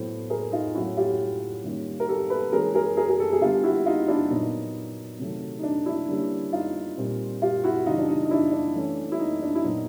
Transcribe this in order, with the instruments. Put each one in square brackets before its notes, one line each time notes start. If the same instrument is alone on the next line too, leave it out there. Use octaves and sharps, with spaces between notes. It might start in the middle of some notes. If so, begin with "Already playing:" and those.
Already playing: [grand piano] A2 F#3 B3 C5
G#4 A#4
D#4 F4
A2 F#3 A3 C#4 E4 F#4
F4 G4
D#3 G3 A#3 C#4
A#4
G4 A4
A4 B4
E3 G#3 C#4 G#4 A#4
G#4 A#4
G#4 A#4
G#4
G4 A4
G#4
D3 G3 B3 F4 G4
E4 F#4
D#4 F4
D4 E4
A#2 F#3 B3 D#4
C3 D#3 F#3 A3
D#4
D4
D4 E4
D3 G3 A#3 C#4
D#4 F4
A#2 G3 C4
F4 G4
E4 F#4
C#3 E3 G3 D#4 F4
D4
D#4
D#4
D4 E4
D4
E3 A3 C#4
E4
D#4
D4
E4
A#2 F#3 B3 D#4